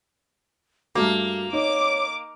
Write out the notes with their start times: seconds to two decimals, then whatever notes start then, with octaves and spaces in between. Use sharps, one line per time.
0.95 G2 A3 A#3 F#4 D6
1.53 D#4 C#5 D6